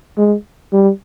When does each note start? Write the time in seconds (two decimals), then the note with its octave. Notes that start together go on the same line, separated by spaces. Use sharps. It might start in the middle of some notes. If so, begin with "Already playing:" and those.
0.17 G#3
0.72 G3